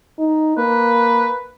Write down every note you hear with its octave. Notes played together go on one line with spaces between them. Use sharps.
D#4
A#3 B4